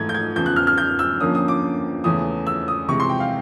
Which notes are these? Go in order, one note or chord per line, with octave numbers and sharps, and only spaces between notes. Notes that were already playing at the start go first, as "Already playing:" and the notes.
Already playing: G#2 E3 A3 G#6
G6
G#6
E2 C#3 F3 G6
F#6
F6
F6
G6
E6
F2 D3 F3 A#3 C#4 D#6
D#6
D6
E2 C#3 E3 A3 C#4 D#6
E6
D#6
C3 E3 G#3 C#6
C6
G5
F5